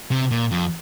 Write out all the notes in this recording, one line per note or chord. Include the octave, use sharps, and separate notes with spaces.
C3
A#2
F2